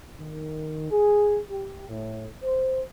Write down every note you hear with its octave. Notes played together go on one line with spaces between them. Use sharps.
D#3
G#4
G4
A2
C5